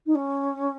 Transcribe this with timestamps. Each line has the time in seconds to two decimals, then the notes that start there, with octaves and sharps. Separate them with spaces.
0.06 D#4
0.15 C#4